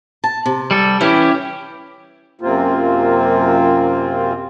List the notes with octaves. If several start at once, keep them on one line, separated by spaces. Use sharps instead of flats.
A5
C3
G3 A4
E3 C#4 E4 G4
F#2 C3 A#3 C4 F4